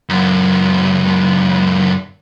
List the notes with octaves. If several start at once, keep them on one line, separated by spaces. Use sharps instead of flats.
C#2 F#2